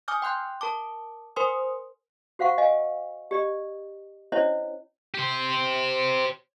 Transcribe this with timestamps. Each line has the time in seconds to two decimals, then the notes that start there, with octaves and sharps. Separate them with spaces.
0.08 G#5 D6 D#6 F6 G6
0.22 G5 C6 F#6 G6
0.61 A#4 A5 D6
1.36 A#4 C5 G#5 C6 D#6
2.39 F#4 C5 F5 F#5 C#6
2.58 D#5 F5 G#5
3.31 G4 D5 D#5
4.32 C#4 D4 E4 C5 C#5 D#5
5.15 G4 C5